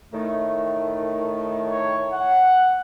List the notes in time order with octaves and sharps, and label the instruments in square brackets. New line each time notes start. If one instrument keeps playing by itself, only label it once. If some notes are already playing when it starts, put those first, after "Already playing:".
[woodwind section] A2 D#3 A3
[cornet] C#5
F#5